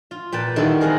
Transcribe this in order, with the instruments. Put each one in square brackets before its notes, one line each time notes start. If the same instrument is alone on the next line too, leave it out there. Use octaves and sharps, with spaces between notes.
[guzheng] F4
A#2 B4 G5 A5
D#3 G3 E4 F#4 A4
C4 G#4 A#4 F5 F#5 A#5